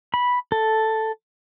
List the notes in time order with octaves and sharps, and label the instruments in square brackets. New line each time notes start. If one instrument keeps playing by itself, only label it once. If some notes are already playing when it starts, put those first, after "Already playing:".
[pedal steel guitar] B5
A4